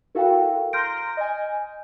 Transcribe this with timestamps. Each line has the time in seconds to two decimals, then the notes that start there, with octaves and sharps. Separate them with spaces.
0.15 E4 F#4 A4 A#4 F5 G5
0.73 A#5 C6 F6 G6 A#6 D7
1.17 D#5 G#5